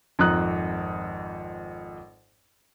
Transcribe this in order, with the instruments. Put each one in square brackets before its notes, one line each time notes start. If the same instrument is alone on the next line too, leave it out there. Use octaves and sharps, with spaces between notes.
[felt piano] G#1 F2 A#5 D#6 F#6